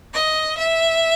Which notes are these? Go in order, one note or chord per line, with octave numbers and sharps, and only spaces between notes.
D#5
E5